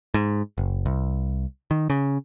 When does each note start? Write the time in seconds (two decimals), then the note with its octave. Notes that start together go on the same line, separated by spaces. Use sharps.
0.14 G#2
0.58 F#1
0.86 C2
1.71 D#3
1.90 C#3